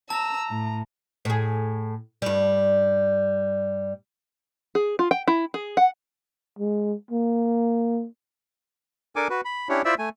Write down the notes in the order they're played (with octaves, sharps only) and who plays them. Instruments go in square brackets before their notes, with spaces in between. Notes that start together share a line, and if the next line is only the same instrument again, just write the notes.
[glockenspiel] A5 [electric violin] A#5 [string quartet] E6
[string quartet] A2
[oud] A2 G#4
G2 G3
[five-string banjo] G#4
F4
G5
E4
G#4
F#5
[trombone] G#3
A#3
[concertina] D4 A4 A#4 G#5 D6
F#4 B4
B5
C#4 D4 E4 G4 C#5
E4 F4 C5 D5 E5 E6
A3 G#5